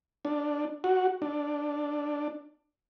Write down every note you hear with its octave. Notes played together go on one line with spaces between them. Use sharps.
D4
F#4
D4